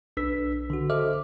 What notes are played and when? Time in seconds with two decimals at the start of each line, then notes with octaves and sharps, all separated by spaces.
0.17 B1 D4 B4 E6 B6
0.70 D3 F#4
0.90 A4 C5 D#5 E5 D6 F6